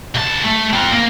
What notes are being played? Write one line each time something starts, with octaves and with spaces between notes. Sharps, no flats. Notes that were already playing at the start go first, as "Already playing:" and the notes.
C2 A5
A3
C4 F4
A#3